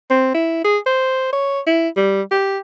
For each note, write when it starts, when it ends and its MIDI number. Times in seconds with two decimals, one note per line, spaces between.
0.11 0.33 60
0.35 0.61 64
0.64 0.78 68
0.86 1.29 72
1.33 1.61 73
1.67 1.89 64
1.96 2.22 55
2.31 2.58 67